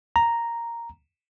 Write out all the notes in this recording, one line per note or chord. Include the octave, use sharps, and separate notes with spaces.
A#5